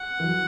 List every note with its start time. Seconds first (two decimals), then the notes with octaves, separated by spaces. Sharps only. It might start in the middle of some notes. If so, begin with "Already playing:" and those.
Already playing: F#5
0.20 E3
0.24 F#3